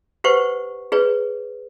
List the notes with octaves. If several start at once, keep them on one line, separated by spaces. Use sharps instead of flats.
G4 B4 C5 F#5 C#6
G#4 B4 C#5